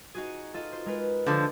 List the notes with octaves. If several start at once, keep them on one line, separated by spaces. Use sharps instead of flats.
D#4 F#4 G#4
F4 A4 D#5
C5
G#3 A#4 B4
D3 F3